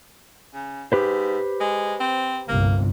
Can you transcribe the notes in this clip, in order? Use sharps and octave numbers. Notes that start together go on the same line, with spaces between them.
C#3
G#2 G4 B4 C5
G#3
C4
G1 C2 C3 A#3